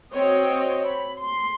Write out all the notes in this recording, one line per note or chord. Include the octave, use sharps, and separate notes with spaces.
C4 F#4 C#5 D#5
B5
C6